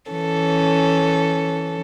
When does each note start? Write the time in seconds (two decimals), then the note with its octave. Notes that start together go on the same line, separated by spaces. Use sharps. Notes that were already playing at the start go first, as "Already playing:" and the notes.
0.11 E3 C#4 A4